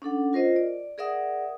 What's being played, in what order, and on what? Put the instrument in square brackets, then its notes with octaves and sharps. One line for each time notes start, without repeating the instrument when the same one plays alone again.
[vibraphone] C#4 D4 A4 F#5
F4 A#4 C5 D#5
D5
G#4 A#4 D5 E5 F#5 D#6